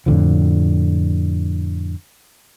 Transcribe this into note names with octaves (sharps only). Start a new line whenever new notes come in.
F2 A2 D3 F3